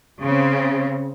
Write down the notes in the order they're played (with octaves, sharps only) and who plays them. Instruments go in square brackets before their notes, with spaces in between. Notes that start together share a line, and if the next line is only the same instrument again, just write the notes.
[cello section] C#3 C4